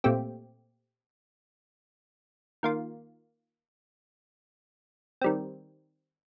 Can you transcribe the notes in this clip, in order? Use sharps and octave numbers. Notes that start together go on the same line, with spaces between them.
A#2 A3 C4 G4
D#3 A#3 F4
D#3 G3 C4